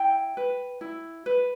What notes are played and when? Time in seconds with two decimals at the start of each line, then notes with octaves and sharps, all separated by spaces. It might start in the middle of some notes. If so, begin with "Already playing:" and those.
Already playing: E4 G5
0.37 B4
0.81 E4
1.26 B4